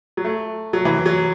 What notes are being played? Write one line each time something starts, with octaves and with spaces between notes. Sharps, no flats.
F#3
A3
F#3
E3
F#3